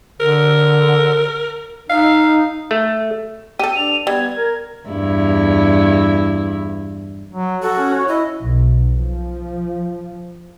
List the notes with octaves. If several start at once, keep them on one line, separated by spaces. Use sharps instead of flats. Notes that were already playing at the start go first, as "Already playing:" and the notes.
D3 A#4
D#4 F5
A3
G4 A4 D#7
D4 F7
G3 B3 G#6
A#4
E2 G2 E4
F#3
F#4 A4
C#4
C#5
E4 D#5
B1
F3